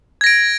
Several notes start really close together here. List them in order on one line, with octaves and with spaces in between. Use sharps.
G#6 A#6 D7